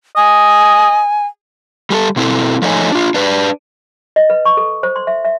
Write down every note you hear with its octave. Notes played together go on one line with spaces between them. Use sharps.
D#5 G#5
G3 G#4 A4
B2 C4 E4 A4
F3 A3 D#4 C#5 G#5
D4 F4
D4 B4 C5 D5
D#5
B4
C#6
A4
C5
C6
E5
E5